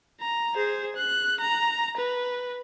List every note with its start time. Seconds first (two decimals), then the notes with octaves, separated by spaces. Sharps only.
0.20 A#5
0.55 G#4 C5
0.96 F#6
1.41 A#5
1.97 B4